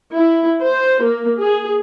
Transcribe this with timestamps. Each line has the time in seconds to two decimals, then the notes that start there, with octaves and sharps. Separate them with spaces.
0.14 E4
0.63 C5
1.04 A#3
1.39 G#4